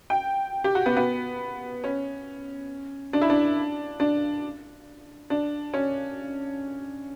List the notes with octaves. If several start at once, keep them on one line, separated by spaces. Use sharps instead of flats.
G5
G4
F#4
B3
B3
C#4
D4
E4
D4
D4
D4
C#4